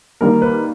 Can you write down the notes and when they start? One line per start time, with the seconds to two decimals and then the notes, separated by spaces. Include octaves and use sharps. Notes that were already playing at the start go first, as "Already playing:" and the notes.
0.21 D#3 G3 A#3 A#4
0.42 B4